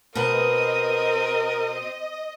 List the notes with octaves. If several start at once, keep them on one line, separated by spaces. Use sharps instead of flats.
B2 C4 A#4 B4 D#5 D#6